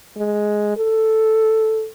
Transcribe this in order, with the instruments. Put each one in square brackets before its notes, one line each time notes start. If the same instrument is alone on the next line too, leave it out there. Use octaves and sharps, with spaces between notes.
[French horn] G#3
A4